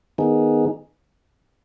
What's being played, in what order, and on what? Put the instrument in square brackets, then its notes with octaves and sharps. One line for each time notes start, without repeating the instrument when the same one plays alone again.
[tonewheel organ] D#3 B3 D#4 G#4